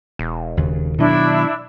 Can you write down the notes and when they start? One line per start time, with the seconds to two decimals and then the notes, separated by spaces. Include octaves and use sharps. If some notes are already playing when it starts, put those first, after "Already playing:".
0.19 E1
0.57 D#2 C#3
0.98 B2 D#3 F#3 D4 E4